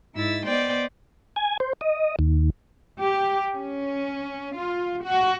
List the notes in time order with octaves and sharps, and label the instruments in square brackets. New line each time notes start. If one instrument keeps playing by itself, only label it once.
[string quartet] G#2 E4 E6 A6
B3 C5 D5 D#5 G5
[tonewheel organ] G#5
C5
D#5
D#2
[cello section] G4
C#4
F4
F#4